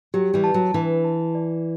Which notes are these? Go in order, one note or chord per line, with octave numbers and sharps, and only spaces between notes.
F#3 G4
E3 G3
A5
F#3
E3 D4
A5
D5